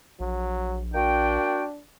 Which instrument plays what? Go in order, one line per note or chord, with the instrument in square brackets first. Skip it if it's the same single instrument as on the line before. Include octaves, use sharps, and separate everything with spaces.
[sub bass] A#1 [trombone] F#3
[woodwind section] A#3 F#4 G5 [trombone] D4